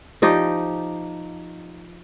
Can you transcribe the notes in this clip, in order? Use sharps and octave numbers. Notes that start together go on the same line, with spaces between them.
F3 D#4 G4